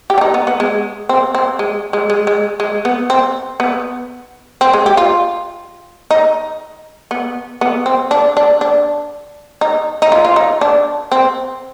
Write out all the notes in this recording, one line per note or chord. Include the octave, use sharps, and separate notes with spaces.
G4
D4
D#4
B3
B3
G#3
C4
C4
G#3
G#3
G#3
G#3
G#3
B3
C4
B3
C4
G#3
G4
F4
D#4
B3
B3
C4
D4
D4
D4
D#4
D#4
F4
F4
D#4
D4
C4